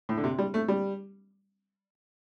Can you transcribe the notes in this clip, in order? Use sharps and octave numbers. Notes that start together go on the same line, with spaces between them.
A2
D3
C3
G3
A3
G3